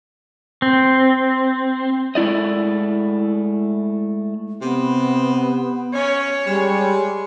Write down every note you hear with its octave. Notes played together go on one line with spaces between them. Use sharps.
C4
G#3 A3 E4 D5 D#5
C3 B3
C#4 C#5
G3 G#3